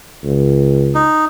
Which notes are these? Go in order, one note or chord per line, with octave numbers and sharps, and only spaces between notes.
C#2
D#4